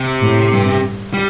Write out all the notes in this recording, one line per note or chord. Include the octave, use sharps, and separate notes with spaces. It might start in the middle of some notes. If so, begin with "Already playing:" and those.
Already playing: C3
A2
G2
G3